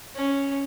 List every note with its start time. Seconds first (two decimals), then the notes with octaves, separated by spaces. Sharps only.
0.15 C#4